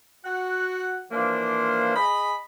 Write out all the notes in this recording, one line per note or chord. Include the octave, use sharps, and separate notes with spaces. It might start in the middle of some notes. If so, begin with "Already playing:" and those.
F#4 F#5
E3 F3 A#3 D4 C5
G#4 D#5 B5